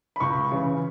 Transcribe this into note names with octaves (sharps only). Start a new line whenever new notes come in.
B5
C#2 C#6
C#3 E3